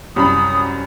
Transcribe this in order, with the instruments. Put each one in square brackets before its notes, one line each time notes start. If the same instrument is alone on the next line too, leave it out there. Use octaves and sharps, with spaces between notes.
[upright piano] C2 F#2 B5 [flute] D#6